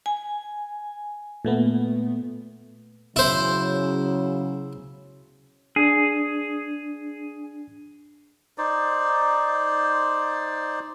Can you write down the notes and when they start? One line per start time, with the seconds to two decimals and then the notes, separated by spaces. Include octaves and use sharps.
0.06 G#5
1.45 A#2 A3 B3
3.16 C#3 F#3 E4 C5
5.76 D4 G#4
8.58 D#4 C5 D5